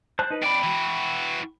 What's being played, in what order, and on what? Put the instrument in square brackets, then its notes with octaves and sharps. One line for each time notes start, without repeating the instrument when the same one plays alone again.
[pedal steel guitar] C5 A5 F#6
D#4 B4
[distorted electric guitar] F2 D5 [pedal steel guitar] G5 B5
[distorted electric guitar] E3 F#4